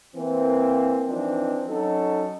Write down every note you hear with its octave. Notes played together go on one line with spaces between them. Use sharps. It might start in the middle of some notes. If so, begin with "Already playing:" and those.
E3 A#3 C4
E3 F3 C4 D4 D#4
F#3 C#4 D#4 A4